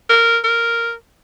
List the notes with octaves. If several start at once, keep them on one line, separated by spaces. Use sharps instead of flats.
A#4
A#4